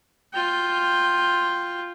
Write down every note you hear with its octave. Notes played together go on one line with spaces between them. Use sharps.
F4 G5